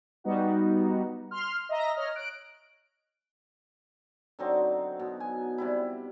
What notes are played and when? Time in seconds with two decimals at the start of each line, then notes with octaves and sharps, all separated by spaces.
0.24 G3 B3 D#4 F#4
1.31 C6 F6
1.69 D#5 E5 A#5 A#6
1.95 C#5 D#5 F6
2.15 F#6 D7
4.39 D3 F#3 C4 D#4
5.00 B2
5.20 G#5
5.58 C3 G3 E4